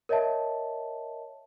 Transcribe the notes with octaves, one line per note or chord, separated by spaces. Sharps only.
A#4 C#5 D#5 E5 A5